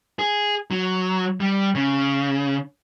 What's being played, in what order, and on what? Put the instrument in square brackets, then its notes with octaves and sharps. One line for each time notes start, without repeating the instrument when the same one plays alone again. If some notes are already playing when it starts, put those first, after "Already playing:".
[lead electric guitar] G#4
F#3
G3
C#3